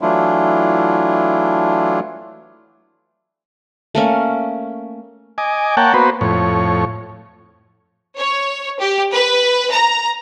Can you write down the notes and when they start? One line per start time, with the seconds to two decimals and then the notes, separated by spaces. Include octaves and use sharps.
0.01 E3 F#3 A3 D4 E4 F4
3.95 A3 A#3 C#4
5.38 D#5 G#5 D6
5.77 A#3 C#5 F#5 G5 A5
5.94 A#3 B3 F#4 B4 C5
6.21 F2 A2 C#5
8.18 C#5
8.80 G4
9.12 B4
9.73 A#5